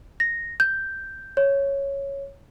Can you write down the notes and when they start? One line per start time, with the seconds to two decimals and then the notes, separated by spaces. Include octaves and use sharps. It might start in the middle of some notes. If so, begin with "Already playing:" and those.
0.20 A#6
0.60 G6
1.37 C#5